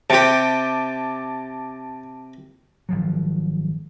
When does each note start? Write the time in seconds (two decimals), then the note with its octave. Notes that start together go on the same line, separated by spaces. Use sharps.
0.10 C3 G4 A5
2.89 G#1 F3 F#3